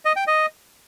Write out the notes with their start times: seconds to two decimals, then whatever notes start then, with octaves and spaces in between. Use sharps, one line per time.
0.05 D#5
0.16 G5
0.27 D#5